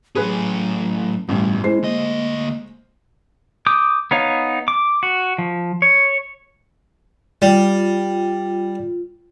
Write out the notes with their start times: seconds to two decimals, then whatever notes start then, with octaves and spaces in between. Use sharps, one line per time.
0.15 A2 F#3 C#4 G#4 B4
1.29 A1 G2 B2 G3
1.64 G#3 E4 C5 C7
1.83 D2 A#3 D#5
3.67 D6 D#6 G6
4.11 B3 D#4 C#5 F5
4.68 D6
5.03 F#4
5.38 F3
5.82 C#5
7.42 G3 F4